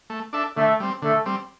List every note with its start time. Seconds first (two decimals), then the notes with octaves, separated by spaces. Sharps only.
0.10 A3
0.33 D4 A4 E5
0.56 D3 A3 A4
0.80 G3 C4
1.02 D3 A3 A4
1.26 G3 C4